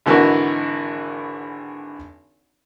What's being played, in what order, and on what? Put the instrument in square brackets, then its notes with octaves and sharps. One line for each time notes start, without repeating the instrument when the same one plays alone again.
[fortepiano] G#1 D3 E3 F#4 A#4 D#5